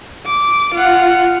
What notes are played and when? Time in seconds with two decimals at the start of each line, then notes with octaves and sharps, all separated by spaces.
0.26 D6
0.74 F4 F#5